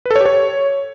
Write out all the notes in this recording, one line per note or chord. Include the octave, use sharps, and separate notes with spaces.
B4
A4
C#5
G4
C#5